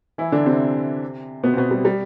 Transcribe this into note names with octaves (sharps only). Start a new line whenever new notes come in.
E3 E4
D3 D4
C3 C4
B2 B3
C4
B2 B3
G3
G3